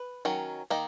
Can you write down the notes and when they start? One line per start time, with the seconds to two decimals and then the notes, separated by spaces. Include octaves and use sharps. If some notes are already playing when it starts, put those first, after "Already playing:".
Already playing: B4
0.25 D#3 F#3 C#4
0.70 D#3 A#3 D#4